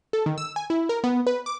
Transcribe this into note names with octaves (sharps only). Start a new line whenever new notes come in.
A4
D#3
E6
G#5
E4
A#4
B3
B4
D6